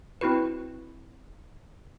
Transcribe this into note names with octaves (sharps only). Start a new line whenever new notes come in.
C4 E4 F#4 B4